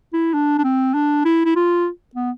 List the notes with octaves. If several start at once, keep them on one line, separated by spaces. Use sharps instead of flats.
E4
D4
D4
C4
D4
E4
E4
F4
B3